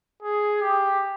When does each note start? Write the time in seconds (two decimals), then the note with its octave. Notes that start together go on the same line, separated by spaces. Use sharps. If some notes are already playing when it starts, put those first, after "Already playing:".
0.22 G#4
0.61 G4